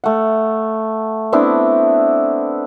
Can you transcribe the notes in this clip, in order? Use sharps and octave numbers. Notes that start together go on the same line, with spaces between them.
A3 F#5
B3 C4 D4 E4